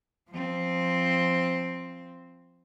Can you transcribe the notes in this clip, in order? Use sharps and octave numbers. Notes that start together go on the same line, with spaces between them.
F3 C4